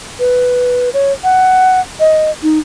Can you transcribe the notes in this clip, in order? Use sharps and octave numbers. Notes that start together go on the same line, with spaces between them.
B4
C#5
F#5
D#5
D#4